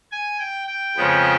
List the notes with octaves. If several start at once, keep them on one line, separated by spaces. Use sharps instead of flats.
G#5
G5
G5
F2 C#3 F3 G#3 B3